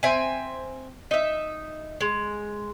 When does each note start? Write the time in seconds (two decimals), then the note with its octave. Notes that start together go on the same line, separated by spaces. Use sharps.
0.03 C4 E5 G#5
1.11 D#4 E5
2.01 G#3